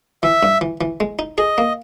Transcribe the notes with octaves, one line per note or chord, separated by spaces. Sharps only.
E3 E5
G2
E3
E3
G#3
D#4
G#4 D#5
A#3